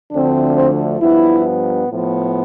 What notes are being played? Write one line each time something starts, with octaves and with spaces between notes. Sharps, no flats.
D2 D3 F3 A3 C4 D4
C4
G2 F3 B3 E4
A2 F3 B3